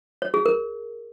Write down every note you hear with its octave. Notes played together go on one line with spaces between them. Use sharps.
C#5
G#4
A#4